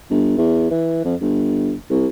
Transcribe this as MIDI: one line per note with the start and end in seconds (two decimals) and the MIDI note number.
0.10 0.33 31
0.37 0.69 40
0.71 1.03 52
1.04 1.14 41
1.21 1.74 31
1.90 2.07 36